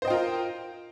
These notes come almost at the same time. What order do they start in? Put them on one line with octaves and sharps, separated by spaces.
C5 D#5 G5 F4 A#4